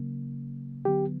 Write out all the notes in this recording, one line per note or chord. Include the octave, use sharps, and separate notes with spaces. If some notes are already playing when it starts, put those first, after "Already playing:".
Already playing: C#3 F#3 A#3
D3 F#3 B3 G4